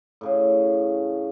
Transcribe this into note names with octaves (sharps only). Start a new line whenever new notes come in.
A2 C#3 G#4